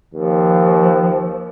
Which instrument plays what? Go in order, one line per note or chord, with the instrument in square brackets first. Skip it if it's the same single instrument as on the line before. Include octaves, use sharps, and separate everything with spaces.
[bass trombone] D#2 [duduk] F3